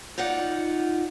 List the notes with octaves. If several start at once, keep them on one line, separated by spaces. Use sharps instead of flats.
D#4 F4 D5 F#5